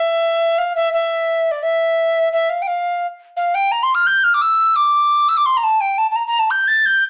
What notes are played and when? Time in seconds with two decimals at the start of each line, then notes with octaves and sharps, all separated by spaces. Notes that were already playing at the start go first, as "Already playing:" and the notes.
Already playing: E5
0.58 F5
0.75 E5
0.93 E5
1.51 D5
1.62 E5
2.32 E5
2.49 F5
2.62 G5
2.67 F5
3.36 F5
3.54 G5
3.71 A#5
3.83 C6
3.94 F6
4.06 G6
4.24 F6
4.34 D6
4.41 E6
4.76 D6
5.28 E6
5.37 D6
5.45 C6
5.57 A#5
5.63 A5
5.80 G5
5.98 A5
6.11 A5
6.15 A#5
6.27 A#5
6.39 A5
6.50 G6
6.67 A6
6.85 G6